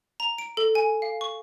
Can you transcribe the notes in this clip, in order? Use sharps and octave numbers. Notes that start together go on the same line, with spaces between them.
A#5
D7
A4
G#5
F5
C#6